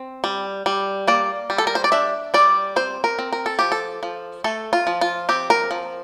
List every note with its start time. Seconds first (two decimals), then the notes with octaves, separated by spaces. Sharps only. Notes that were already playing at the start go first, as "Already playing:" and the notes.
Already playing: C4
0.24 G3
0.66 G3
1.08 A#3 D5
1.50 G3
1.58 A4
1.67 A#4
1.75 C5
1.84 D5
1.92 D4 E5
2.34 G3 D5
2.76 C4 C5
3.04 A#4
3.19 C4
3.32 A#4
3.46 A4
3.59 F3 G4
3.72 A4
4.03 F3
4.44 A3 A4
4.73 F4
4.87 F3
5.01 F4
5.29 C4 G4
5.50 A#4
5.71 F3